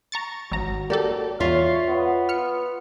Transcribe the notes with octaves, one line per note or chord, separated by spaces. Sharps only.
A#5 C#6 A6
G#1 F#3 A#5
A#3 G4 A4 D5
E2 F4 C#5 E5 F5
B3
F6 C#7